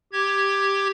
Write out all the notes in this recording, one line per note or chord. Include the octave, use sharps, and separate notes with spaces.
G4 G#6